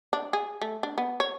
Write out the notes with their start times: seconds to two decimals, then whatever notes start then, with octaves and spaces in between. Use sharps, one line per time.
0.13 D4
0.33 G#4
0.61 A3
0.83 D4
0.98 B3
1.20 C#5